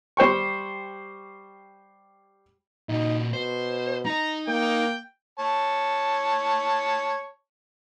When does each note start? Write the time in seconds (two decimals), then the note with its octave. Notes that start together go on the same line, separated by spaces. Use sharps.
0.17 G3 C5 G5 C#6
2.89 A#2 D#4 F#4
3.33 B2 C5
4.06 D#4 D#5 A#5
4.48 A#3 G5
5.39 C#5 A5